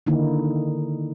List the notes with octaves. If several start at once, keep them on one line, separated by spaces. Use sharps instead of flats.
D3 D#3 A#3 D#4 E4